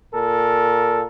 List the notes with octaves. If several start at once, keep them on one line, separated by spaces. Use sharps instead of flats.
A#2 A4 A#4